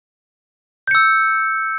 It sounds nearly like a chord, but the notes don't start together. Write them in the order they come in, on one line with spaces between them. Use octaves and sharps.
G6 C#7 E6